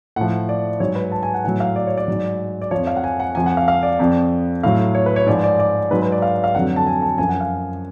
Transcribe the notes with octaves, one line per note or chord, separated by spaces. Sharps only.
A2 F3 F#5
D5
G#2 F#3 C#5
B4
A5
G#5
F#5
A2 F#3 F#5
F5
D5
C#5
D5
G#2 F#3
D5
F2 F3 C#5
F5
F#5
G#5
F#5
F2 F3 G#5
F#5
F5
F5
D5
F2 F3
A2 F#3 F5
C#5
B4
C#5
G#2 F3 D5
D5
D5
G#2 F#3 B4
B4
D5
F5
F5
F2 D3 F#3 F#5
A5
G#5
A5
F#2 F3 G#5
F#5
F5